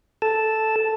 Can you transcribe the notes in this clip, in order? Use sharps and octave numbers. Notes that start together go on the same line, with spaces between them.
A4 A5